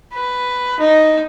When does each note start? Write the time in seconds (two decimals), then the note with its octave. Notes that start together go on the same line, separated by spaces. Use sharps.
0.14 B4
0.80 D#4